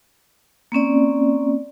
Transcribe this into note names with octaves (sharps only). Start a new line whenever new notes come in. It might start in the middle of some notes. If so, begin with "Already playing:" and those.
A#3 C4 C#4 D5